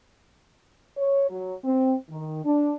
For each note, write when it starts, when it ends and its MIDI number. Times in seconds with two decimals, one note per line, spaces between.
0.98 1.26 73
1.29 1.54 54
1.64 1.96 60
2.10 2.44 51
2.45 2.77 62